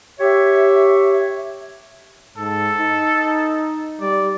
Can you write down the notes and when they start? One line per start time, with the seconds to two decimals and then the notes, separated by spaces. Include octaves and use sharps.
0.20 G4 C#5 E5
2.38 G#2 A4
2.79 D#4
4.01 G3 D5